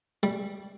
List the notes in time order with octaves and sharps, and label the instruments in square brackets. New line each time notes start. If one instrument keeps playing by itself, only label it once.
[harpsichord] G3